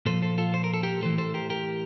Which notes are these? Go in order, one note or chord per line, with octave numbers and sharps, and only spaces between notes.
A#2 F3 A4 C5
A4 C5
F4 A4
C5
A#4
A4
G4 A#4
A2 E3 A4 C5
A4 C5
G4 A#4
G4 A#4